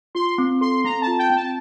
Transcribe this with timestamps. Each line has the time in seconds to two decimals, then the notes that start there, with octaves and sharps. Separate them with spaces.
0.15 F4 C6
0.38 C4
0.61 A4 C6
0.84 C4 A#5
1.01 A5
1.07 F4
1.19 G5
1.30 C4
1.36 A5